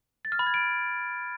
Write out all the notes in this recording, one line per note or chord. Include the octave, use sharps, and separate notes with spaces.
A6
F6
B5
G#6
D7